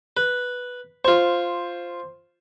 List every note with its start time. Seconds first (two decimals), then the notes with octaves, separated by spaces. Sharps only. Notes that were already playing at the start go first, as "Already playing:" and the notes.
0.17 B4
1.04 F4 C5 C#6